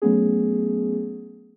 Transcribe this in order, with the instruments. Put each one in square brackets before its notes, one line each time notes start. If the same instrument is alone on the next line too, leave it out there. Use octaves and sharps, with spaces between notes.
[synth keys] F#3 A3 B3 C#4 G#4